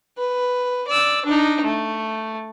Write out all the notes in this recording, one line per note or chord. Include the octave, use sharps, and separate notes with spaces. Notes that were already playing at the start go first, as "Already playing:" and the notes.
B4
D5 E6
D4 D#4
A3